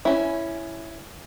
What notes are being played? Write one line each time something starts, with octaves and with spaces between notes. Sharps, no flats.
C#4 E4